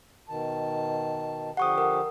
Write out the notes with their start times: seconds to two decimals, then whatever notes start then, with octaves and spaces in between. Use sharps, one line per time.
0.28 B2 D#3 A5
1.57 D3 F3 G4 F#5 C#6 D#6
1.78 A#4